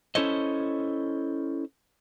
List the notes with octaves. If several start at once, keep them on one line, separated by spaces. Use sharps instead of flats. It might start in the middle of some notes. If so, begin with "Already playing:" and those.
C#4 E4 A4 C5 C#5 D#5